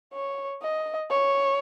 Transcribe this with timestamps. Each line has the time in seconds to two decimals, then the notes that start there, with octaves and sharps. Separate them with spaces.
0.13 C#5
0.62 D#5
1.10 C#5